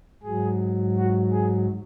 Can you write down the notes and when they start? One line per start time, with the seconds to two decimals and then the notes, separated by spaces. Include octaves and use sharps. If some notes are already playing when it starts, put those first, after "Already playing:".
0.23 G#2 F#3 G#4
0.96 F#4
1.32 G#4